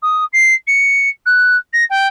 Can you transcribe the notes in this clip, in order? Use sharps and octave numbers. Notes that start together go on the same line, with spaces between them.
D#6
C7
C#7
F#6
A#6
G5